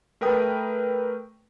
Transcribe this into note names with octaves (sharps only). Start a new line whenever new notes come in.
A3 A#4 B4 G5 D#6